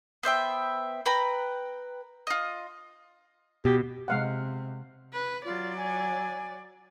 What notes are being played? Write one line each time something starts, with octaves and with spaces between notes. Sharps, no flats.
B3 C5 E5 G5
B4 G5 A#5 B5
F4 D#5
B2 G4
C3 G#3 F5 F#5
B4
F#3 F4 D5
G#5